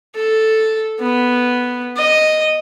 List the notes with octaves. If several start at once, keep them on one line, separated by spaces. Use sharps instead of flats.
A4
B3
D#5